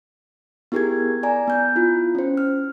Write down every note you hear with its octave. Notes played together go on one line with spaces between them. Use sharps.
B3 E4 G4 G#4 A#4 G#6
D5 G#5 A#5
B3 G6
E4 F4
C#4 C5
F6